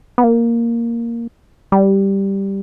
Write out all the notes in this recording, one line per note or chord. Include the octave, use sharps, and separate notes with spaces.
B3
A#3
G3